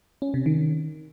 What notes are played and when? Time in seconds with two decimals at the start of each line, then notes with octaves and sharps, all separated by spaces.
0.22 C#4
0.34 C3
0.46 D#3